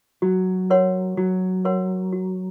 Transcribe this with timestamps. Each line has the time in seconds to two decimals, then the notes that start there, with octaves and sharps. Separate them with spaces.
0.22 F#3 F#4
0.70 A#4 C#5 F#5 C6
1.17 F#3 F#4
1.65 A#4 C#5 F#5 C6
2.12 F#4